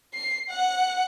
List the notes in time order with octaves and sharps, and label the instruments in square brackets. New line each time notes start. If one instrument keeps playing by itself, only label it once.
[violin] C7
F#5